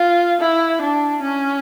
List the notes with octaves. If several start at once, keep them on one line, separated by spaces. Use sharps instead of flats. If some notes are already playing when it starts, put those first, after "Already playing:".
Already playing: F4
E4
D4
C#4